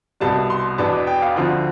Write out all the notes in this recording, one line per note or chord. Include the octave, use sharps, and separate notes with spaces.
C2 B2 G3 A5
C6
E2 B2 B3 D4 A5
G5
F5
D2 D3 F3 C4